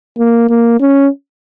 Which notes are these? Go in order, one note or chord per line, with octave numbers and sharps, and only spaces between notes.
A#3
A#3
C#4